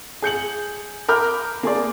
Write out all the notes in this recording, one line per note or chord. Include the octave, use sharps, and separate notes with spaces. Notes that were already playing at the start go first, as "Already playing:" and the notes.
G#4 G6 C#7 F#7
A#4 B5 D6 F6 G6
A#3 G#4 D5